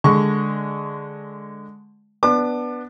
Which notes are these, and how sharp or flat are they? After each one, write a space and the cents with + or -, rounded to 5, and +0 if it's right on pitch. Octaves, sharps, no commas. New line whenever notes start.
D3 +0 G#3 +0 C#6 +5
B3 +0 D4 +0 D6 +35